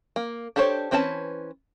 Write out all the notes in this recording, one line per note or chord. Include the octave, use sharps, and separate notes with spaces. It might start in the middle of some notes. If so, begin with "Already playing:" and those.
A#3
D4 G4 A4 C5 C#5
E3 C4 C#4 B4 A5